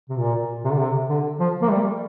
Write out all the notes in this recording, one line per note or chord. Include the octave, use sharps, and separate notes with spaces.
C3
A#2
C3
D3
C3
D3
F3
A#3
G3